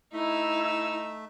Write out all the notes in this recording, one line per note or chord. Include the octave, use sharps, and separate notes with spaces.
A3 D#4 E4 E5 E6